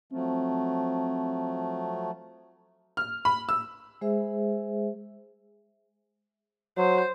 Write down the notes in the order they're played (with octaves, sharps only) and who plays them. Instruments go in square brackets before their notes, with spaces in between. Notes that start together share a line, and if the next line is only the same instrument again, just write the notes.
[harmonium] F3 F#3 A3 [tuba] C4
[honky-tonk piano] F6
B5
E6
[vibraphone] G#3 G#4 C5 E5
[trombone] F#3 [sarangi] C5